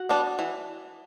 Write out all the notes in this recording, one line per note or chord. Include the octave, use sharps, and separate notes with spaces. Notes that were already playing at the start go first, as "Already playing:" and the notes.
Already playing: F#4 F#5
G3 B3 D4
E3